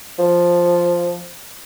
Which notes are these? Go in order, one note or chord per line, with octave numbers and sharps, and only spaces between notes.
F3